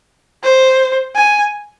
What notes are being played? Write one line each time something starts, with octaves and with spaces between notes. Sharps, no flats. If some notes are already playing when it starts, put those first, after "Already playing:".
C5
G#5